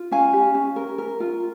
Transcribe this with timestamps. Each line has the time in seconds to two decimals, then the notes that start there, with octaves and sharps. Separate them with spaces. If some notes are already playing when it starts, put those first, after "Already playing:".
Already playing: F4
0.11 C#4 F5 G#5
0.33 G4
0.55 C#4
0.76 A#4
0.98 A#4
1.20 F4